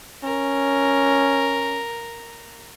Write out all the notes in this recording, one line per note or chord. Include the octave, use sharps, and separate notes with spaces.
C#4 A#4